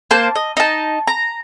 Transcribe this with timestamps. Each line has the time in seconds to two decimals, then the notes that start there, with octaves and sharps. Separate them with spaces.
0.11 A#3 C5 A5
0.35 D#5
0.57 D#4 A5
1.07 A#5